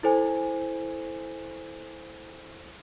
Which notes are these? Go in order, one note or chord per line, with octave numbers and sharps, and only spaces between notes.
E4 A4 C5 G#5